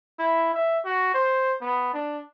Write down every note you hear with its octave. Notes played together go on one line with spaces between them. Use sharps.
E4
E5
F#4
C5
B3
D4